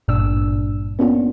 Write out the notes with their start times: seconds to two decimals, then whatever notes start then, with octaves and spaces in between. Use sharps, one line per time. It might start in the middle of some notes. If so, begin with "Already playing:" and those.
0.08 G#1 G2 A#2 D4 E6
0.99 A#3 B3 C#4 D4 F4